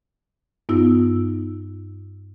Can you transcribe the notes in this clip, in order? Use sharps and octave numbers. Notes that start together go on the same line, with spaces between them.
G2 B3 D#4 F4 E6